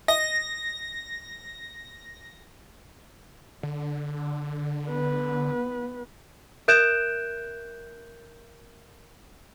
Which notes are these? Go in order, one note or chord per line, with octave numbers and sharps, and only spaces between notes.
D#5 A#6
D3
B3 B4
A#4 E5 F#6 G6 D7 E7